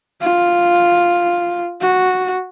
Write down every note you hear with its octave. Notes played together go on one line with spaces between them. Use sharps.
F4
F#4